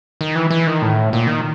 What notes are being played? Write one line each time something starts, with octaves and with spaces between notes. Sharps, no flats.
D#3
E3
E3
D#3
A2
A#2
D#3